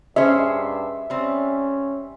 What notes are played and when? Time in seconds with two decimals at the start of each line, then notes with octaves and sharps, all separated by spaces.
0.16 G2 C#4 G#4 C5 E5
1.10 G3 C4 C#4